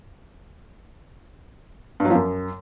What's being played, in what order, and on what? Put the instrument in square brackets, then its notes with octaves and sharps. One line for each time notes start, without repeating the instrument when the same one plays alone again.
[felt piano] G2
F#3
F3
F#2